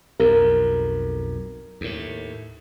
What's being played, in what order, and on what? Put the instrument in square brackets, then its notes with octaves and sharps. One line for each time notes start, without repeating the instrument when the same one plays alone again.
[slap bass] B1 F2 [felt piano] A#4
[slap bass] D#2 A2